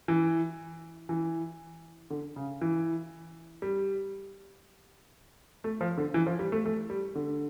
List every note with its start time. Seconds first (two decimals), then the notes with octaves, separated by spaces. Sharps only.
0.08 E3
1.09 E3
2.10 D3
2.36 C#3
2.61 E3
3.62 G3
5.64 A3
5.81 F3
5.98 D3
6.14 E3
6.27 F3
6.39 G3
6.52 A3
6.66 A3
6.90 G3
7.15 D3